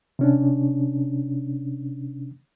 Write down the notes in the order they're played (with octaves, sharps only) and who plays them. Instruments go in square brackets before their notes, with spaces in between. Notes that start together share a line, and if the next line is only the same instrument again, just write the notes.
[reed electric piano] C3 C#4 D4